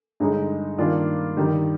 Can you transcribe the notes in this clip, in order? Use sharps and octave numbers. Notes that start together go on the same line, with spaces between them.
G2 D3 G#3 D#4
G2 D#3 A#3 D4 F4
G2 D#3 G3